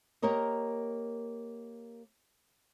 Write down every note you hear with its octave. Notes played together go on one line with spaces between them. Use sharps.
A#3 G4 A#4 C#5 D#5